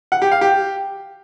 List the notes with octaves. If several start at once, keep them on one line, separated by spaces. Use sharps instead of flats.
F#5
G4
F5
G4